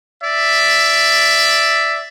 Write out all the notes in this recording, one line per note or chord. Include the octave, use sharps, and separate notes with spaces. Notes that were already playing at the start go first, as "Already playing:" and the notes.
D5 E5